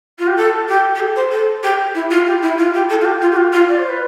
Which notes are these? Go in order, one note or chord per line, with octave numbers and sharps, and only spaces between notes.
F4
G4
A4
G4
G4
A4
C5
A4
G4
E4
F4
G4
E4
F4
G4
A4
F4
G4
F4
G4
F4
F4
D5
C5
B4